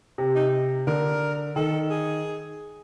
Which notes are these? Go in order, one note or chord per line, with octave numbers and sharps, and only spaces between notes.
C3
D#4
D3 A#4
D#3 A4
G#4